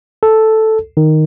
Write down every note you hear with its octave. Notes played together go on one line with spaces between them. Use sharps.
A4
D#3